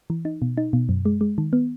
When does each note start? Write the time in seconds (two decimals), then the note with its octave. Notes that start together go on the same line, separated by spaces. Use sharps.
0.10 E3
0.25 D#4
0.42 B2
0.57 D#4
0.73 B2
0.89 F#2
1.05 G#3
1.21 G#3
1.38 D#3
1.53 B3